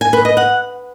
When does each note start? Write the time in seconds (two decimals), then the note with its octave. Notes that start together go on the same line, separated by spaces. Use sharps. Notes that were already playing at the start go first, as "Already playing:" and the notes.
0.01 G#5
0.13 B4
0.25 D#5
0.37 F#5